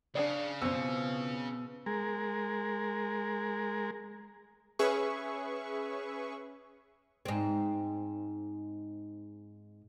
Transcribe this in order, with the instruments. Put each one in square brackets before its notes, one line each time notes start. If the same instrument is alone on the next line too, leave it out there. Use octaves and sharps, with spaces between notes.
[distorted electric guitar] C#3 [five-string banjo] D4 G#4 D5
[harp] B2 [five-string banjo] E3 F3 [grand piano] C4 E6
[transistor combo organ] G#3 A#4
[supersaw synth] C#4 G#4 B4 E5 C#6
[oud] G#2 C4